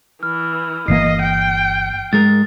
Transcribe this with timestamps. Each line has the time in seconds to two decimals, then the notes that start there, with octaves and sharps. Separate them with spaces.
0.23 E3 F6
0.88 G1 E3 A#3 D#5 C7
1.22 G5
2.13 G#2 G#3 A#4 A6